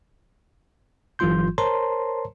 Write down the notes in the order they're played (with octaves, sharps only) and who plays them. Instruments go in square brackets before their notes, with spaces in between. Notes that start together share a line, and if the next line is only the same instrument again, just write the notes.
[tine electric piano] G1 E3 F#3 F4 C6 G6
A#4 C5 C#5 A5 A#5 C6